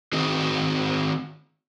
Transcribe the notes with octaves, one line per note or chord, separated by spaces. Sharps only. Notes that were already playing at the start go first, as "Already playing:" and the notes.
D#3 C4 D#4 F#4 G#4